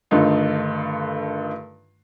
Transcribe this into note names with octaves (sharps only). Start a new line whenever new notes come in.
G2 D3 D#3 A3 D#4 F4